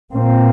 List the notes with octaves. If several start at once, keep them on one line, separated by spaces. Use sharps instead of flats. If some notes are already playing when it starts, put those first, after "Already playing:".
A#2 A#3 C4